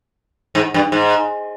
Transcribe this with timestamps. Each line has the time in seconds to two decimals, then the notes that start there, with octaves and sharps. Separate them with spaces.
0.55 G#2
0.74 G2
0.92 G#2